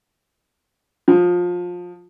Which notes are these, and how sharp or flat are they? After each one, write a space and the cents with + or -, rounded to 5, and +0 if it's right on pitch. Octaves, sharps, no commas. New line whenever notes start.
F3 +20